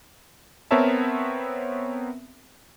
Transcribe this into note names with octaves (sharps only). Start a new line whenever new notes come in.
B3 C4 A#4 C#5 E5 A5